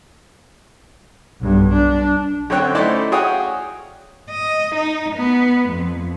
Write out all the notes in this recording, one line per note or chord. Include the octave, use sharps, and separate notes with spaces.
B1 G2
D4
F#2 D3 C4 C#5 G5 F#6
A3 C#4 D#4 E4 C5 D5
F#4 G#4 C#5 F5 G5 D#6
D#5
D#4
B3
F2